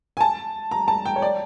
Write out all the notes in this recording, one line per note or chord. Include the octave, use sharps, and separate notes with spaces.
G#5
A5
A#5
A5
G5
C#5
D5